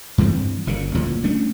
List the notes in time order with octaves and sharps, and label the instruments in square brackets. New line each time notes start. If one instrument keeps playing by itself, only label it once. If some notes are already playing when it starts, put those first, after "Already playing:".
[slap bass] G2 E3 G3 C4
G1 A#2 C#3
D2 A#2 E3 F#3
G3 A3 C#4 D4